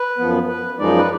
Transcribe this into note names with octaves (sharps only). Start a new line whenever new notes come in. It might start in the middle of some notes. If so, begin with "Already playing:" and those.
Already playing: B4
F#2 F3 B3
B4
F#2 F3 G#3 D#4 D5
B4